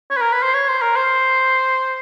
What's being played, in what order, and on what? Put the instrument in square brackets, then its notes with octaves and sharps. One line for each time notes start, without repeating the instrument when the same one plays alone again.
[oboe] C#5
B4
A#4
B4
C5
C#5
C5
A#4
C5